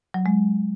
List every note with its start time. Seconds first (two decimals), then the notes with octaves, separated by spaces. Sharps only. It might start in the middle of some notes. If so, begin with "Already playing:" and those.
0.14 F#3
0.26 G#3